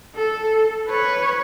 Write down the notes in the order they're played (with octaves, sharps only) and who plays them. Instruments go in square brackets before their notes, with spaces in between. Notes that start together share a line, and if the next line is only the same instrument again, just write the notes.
[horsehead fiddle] A4
B4 C#5